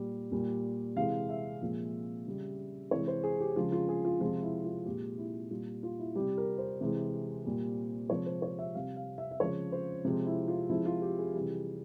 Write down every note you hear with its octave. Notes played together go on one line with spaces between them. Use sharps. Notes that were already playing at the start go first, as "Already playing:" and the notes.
Already playing: A#2 G3
A#2 G3
C3 E3 G#3 F5
E5
A#2 F3 G#3
C#3 G3
C3 E3 G#3 C#5
C5
G#4
G4
C#3 F3 G#3 F4
F4
G#4
F4
C3 F3 G#3 F4
E4
F4
A#2 G#3 G4
E4
A#2 G3 F4
F4
E4
C3 G3 G4
A#4
C5
C3 E3 G#3
A#2 G3
C3 F3 G#3 C#5
C5
C#5
E5
C3 G3 F5
F5
E5
E5
C#3 F3 G#3 C#5
C5
C3 F3 G#3
E4
F4
C3 F3 G#3 E4
F4
G4
G#4
C3 E3 G3